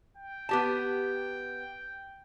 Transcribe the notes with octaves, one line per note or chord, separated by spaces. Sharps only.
G5
B3 G4 A5